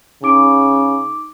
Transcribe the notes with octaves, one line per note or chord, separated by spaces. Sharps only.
C#3 D#4 D6 D7